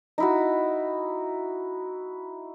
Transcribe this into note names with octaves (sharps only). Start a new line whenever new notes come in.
D#4 E4 F#4